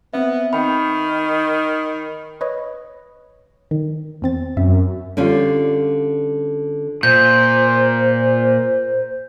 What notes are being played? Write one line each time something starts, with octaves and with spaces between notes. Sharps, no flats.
B3 C4 E5
D#3 G5 B5
B4 C#5 D#5
D#3
E2 C4 A6
F#2 E5
D3 G3 C#4 F4
A#2 C5 G6